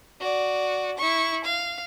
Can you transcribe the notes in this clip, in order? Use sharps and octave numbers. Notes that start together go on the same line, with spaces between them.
F#4 D5
E4 C#6
F5